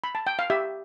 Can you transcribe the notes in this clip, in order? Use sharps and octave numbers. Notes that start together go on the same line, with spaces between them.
B5
A5
G5
F5
G4 E5